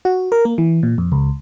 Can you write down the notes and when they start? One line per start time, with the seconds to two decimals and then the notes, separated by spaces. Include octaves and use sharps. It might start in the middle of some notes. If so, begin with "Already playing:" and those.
0.05 F#4
0.32 A#4
0.45 A#3
0.58 E3
0.83 A#2
0.98 F2
1.12 C#2